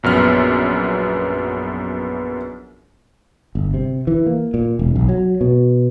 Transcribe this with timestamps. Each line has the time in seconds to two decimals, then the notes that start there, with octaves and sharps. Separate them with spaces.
0.03 A#1 F#2 B3 F6
3.55 G1
3.74 C3
4.07 E3
4.26 A#3
4.54 A#2
4.79 E1
4.96 B1
5.09 F#3
5.41 B2